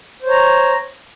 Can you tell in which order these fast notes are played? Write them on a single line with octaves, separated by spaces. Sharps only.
C5 C#5 A#5